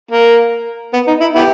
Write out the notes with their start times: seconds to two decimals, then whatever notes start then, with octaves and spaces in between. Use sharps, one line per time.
0.12 A#3
0.94 B3
1.07 D#4
1.21 E4
1.35 B3 E4 G4